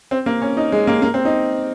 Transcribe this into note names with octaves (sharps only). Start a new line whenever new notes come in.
C4
A#3
C#4
D#4
G#3
A#3
A#3
C4
D#4